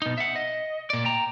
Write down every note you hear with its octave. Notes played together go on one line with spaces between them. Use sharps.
B2 D#4
E5 F#5
D#5
A#2 D5
G5 A#5